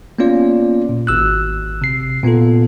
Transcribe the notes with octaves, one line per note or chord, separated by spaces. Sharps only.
A#3 B3 C#4 F4 D5
A#2
G#1 E6 F#6
C3 C7
A#2 B3 F4 A4